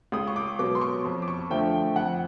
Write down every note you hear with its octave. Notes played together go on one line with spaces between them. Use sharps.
C#2 D#6
C#6
D6
B2 F#3 B3 D6
C6
C#6
F2
D6
C#6
D3 F3 A3 G5
G5
F2 F#5